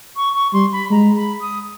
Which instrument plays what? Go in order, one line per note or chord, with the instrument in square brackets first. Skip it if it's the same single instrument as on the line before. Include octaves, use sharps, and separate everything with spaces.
[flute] C#6
C#6
[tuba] G3 [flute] C6
[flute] B5
[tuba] G#3 [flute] A#5
[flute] B5
D#6